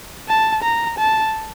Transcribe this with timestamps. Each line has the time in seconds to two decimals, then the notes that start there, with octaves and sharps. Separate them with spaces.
0.28 A5
0.63 A#5
0.98 A5